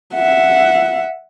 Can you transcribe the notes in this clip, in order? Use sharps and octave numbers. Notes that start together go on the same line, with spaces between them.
E5 F#5